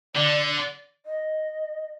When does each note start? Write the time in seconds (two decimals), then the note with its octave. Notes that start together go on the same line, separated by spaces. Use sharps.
0.15 D3 D5
1.06 D#5